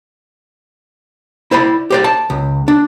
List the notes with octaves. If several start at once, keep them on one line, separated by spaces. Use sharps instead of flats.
E4 C5 D5 B5
G4 C5 D5
A5
C#2
D4